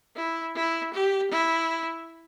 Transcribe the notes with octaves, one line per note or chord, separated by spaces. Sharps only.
E4
E4
G4
E4